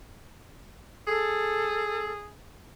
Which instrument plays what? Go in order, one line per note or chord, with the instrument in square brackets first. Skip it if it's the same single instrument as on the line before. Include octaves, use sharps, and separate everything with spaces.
[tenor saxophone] G#4 [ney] A4